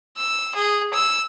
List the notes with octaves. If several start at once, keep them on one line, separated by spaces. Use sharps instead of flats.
E6
G#4
E6